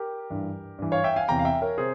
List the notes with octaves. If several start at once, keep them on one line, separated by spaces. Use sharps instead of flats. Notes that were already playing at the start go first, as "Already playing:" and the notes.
Already playing: G4 A#4
G2 E3
G2 E3
C#5 F5
E5 G5
F5 G#5
E2 C3 E3 G5 A#5
F5
E5 G5
A#4 C#5
C3 G#4 C5